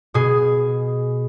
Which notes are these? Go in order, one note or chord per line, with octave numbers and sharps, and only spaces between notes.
B2 G#4